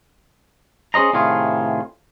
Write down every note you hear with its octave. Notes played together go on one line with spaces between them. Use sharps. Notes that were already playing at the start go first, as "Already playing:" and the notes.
C#4 G#4 C5 D#5 A#5
A2 C3 D#3 F4 G#4